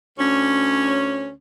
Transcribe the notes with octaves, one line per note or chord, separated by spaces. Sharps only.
D2 C#4